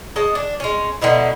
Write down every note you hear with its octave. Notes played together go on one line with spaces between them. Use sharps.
G#3 C#5 D#5 A5
D4
G#3 C#4
B2 D3 D#4 E4